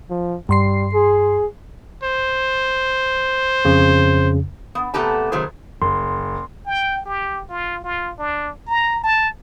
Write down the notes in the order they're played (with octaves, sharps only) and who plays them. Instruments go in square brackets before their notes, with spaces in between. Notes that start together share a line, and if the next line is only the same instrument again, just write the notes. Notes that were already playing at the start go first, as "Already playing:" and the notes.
[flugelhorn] F3
[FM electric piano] G2 C6 C7 [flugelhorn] G3
[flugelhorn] G#4
[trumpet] C5
[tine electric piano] F2 C#3
[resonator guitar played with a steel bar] B3
C3 A3 B3 G4 A5 A#5
C3 D#3 F#3 A3 G#4 C5
[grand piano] F#1 [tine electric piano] C6
[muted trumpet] G5
G4
F4
F4
D4
A#5
A5